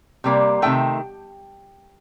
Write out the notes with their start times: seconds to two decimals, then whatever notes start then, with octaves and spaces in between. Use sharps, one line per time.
0.24 C3 G3 A#3
0.62 C3 D#3 A3 G5